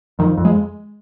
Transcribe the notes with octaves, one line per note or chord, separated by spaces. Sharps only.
F2 D#3
F2
G#3